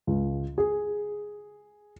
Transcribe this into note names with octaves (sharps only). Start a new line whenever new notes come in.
C#2
G#4